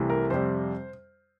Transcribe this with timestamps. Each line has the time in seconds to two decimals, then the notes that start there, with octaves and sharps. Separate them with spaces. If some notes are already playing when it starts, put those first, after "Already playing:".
Already playing: C2 C3 E3 A3
0.10 A#4
0.30 F2 C3 G3 C5